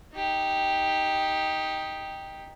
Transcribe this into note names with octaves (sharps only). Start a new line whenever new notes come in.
D#4 G4